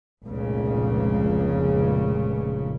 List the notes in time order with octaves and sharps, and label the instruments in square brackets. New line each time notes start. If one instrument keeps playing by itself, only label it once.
[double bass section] F1 C#2 A#2 C#3